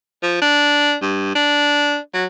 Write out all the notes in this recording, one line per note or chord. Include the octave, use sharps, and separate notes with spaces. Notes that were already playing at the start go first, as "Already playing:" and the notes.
F3
D4
G2
D4
F#3